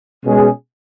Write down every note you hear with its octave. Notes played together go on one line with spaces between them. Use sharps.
B2 G#3 C#4 G#4